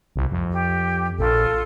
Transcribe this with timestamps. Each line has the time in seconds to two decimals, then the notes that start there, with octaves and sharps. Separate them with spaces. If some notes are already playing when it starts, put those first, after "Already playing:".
0.16 C2
0.31 F2
0.53 G4
1.19 A#1 F4 A4